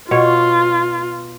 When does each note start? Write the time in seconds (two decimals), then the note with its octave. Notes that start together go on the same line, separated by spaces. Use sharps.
0.11 B2 F4 C#5